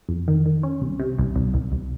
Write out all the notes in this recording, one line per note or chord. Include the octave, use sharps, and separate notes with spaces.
F2
D#3
D#3
C#4
C2
C3
C2
C2
C2
C2